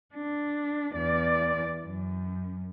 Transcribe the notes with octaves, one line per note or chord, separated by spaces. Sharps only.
D4
E2 D5
F#2